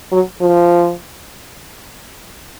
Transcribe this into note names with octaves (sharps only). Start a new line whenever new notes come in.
F#3
F3